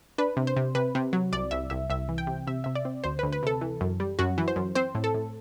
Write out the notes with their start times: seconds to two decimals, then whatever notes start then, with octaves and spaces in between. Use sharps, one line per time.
0.18 D4 B4
0.37 C3
0.47 C5
0.57 C3
0.75 C3 B4
0.95 C3
1.13 F#3
1.32 C2 D5
1.51 C2 E5
1.70 C2 E5
1.90 C2 E5
2.09 E3
2.18 G5
2.27 C3
2.47 C3 E5
2.64 C3 E5
2.75 D5
2.85 C4
3.04 D2 C5
3.19 D2 B4
3.33 B4
3.43 C3 A4
3.61 E3
3.81 F#2
4.00 G3
4.19 F#2 F#4
4.38 E3
4.48 C5
4.56 F#2
4.75 C4 C5
4.95 A2
5.04 A4
5.14 A2